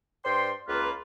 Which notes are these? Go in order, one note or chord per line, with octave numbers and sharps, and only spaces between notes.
G2 C5 D5 G5 C6
C#2 A#3 F4 B4